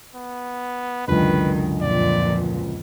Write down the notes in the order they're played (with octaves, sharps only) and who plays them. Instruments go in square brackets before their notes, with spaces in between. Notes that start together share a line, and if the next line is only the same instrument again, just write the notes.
[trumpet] B3
[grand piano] C#2 F#2 D3 [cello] D#3 [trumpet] B4
[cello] F2 A#2 [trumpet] D5